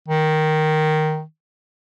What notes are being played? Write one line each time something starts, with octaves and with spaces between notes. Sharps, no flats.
D#3